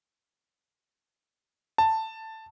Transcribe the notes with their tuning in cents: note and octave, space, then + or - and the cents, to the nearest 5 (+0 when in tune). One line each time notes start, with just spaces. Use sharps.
A5 +10